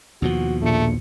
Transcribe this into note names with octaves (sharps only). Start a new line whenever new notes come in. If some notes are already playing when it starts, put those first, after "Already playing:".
D#2 B2 F3 F#4
A#1 A#2 A3 C#7